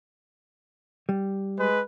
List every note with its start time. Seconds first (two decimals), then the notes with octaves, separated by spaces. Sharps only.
1.09 G3
1.57 G#3 B4